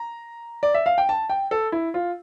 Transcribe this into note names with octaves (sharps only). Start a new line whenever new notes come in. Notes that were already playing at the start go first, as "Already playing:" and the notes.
Already playing: A#5
D5
E5
F5
G5
A5
G5
A4
E4
F4